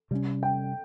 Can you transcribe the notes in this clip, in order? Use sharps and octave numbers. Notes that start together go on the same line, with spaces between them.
C3 G3 A#3 C#4
G5